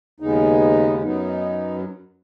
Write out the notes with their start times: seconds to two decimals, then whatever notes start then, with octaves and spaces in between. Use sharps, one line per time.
0.20 D#2 C#3 G#3 B3 D#4
1.03 F#2 F#3 B3 D#4